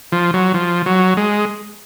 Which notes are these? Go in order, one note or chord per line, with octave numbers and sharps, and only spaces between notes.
F3
F#3
F3
F#3
G#3